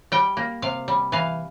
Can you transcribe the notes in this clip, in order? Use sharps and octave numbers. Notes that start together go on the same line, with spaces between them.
G3 G5
A#3
C3 F5
G3
E3 F5